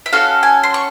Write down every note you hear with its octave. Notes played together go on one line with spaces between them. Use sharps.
E5
C#4 F#4 A4 F5
G#5
C6
C#6